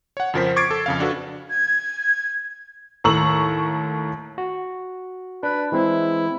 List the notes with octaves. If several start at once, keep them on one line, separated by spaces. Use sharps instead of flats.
C#5 F#5
F2 C#3 F3 A#4 C5 B6
C#6 D6 G#6 A6 C7 D7
A4
F2 C#3 F5
D4 F#4 A4 B4
G#6
D#2 A2 A#5 C#6 E6 F#7
F#4
D4 B4
E3 G#3 C4 E4